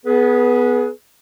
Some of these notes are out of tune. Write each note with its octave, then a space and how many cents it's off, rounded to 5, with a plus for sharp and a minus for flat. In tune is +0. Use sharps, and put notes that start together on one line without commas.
B3 +10 G#4 +20 B4 -15